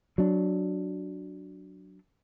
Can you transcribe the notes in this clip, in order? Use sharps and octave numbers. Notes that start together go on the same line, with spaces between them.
F#3 D4